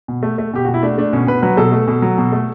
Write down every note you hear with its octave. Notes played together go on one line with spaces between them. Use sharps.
B2
A3
A3
B2 G4
B2 F#4
E4
A3 D4
A3 D4
B2 C#4
B2 B4
F#3 B4
B2 A4
A3
B2
F#3
B2
A3